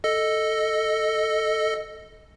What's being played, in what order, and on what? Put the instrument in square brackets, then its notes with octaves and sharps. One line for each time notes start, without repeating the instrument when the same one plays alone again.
[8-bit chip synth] A4 D#5